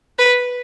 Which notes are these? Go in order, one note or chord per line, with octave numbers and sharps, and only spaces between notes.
B4